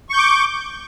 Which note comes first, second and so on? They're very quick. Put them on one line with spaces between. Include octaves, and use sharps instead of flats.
C#6 G6 D6